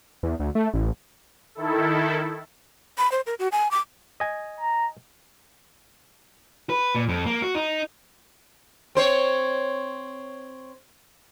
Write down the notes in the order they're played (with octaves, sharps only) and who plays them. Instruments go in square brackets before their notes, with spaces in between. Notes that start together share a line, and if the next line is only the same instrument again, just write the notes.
[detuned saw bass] E2
D2
A3
A1
[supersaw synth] D#3 E4 A4
[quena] B5
C5
A#4
F#4
G#5
D6
[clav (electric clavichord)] D#5 G#5
[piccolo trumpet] A#5
[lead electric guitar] B4
A#2
F2
A#3
F#4
D#4
[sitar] C4 C5 C#5